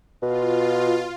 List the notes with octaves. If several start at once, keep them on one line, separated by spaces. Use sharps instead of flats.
B2 F4